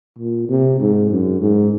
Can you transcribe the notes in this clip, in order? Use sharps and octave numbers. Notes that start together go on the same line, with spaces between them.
A#2
C3
G#2
F#2
G#2